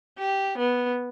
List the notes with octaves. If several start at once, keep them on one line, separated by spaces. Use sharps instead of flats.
G4
B3